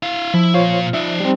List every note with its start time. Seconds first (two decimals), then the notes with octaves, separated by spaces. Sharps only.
0.03 E4 F5
0.34 F3 E4
0.54 A#2 F4 C5 C#5 F5
0.94 D#4 D5 E5
1.20 G3 C4